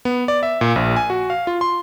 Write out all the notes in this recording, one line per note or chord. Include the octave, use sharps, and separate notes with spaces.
B3
D5
E5
A#2
A#1
G#5
F#4
F5
F4
C6